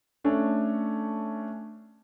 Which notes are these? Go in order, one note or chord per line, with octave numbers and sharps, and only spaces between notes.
A3 C#4 D4 A4